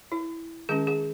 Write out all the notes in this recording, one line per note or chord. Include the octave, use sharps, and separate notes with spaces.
E4
D#3 G#3 C#4 G#4
G#4